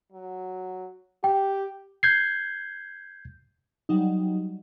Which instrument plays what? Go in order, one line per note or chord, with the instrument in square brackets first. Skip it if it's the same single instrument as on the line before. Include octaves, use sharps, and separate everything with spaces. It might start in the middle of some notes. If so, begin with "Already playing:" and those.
[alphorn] F#3
[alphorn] G4 [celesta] G5
[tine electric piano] G6 G#6 C7
[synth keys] F#3 G3 D#4